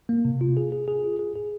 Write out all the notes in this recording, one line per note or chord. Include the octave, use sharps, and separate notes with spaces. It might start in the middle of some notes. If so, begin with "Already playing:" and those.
A#3
C3
F4
G#4
G#4
G#4
F4
G#4
G#4